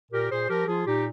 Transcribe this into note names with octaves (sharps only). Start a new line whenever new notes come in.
A#2 G4 A#4
A#2 G#4 C5
F3 G4 A#4
F3 F4 G#4
A#2 D#4 G4